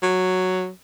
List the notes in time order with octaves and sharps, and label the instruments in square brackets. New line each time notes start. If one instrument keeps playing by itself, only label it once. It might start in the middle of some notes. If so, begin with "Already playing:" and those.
[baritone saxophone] F#3